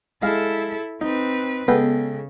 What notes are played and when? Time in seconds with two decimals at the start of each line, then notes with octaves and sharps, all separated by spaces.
0.22 G#3 E4 A4 F5
1.01 C4 D#4 B4
1.68 C#3 G#3 B3 A4 G5